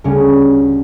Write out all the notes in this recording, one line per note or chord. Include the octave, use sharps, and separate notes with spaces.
D2 C#3 G3 C#4